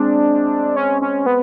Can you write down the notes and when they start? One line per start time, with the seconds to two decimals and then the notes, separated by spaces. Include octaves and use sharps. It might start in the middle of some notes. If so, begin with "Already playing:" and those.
Already playing: G#3 C4 D4
0.76 C#4
1.02 C#4
1.26 B3